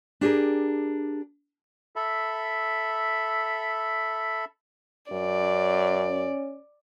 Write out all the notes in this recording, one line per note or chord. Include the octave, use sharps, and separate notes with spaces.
D4 G4 G#4 A#4
A4 E5 B5
F#2 C#4 D5